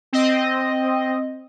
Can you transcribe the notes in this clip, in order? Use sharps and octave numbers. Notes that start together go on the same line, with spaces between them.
C4 D#5